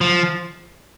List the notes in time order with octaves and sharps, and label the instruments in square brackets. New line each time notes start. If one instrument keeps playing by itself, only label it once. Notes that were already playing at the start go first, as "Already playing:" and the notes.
[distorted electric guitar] F3